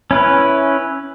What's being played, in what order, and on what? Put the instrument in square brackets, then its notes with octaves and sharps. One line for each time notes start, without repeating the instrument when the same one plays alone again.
[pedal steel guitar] C#4 E4 B4